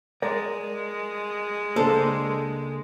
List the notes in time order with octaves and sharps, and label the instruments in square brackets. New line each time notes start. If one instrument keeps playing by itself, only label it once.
[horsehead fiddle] G#3 [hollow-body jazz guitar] A#4 D5
[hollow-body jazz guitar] C#2 A#3 [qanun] D4 C5 [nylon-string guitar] A4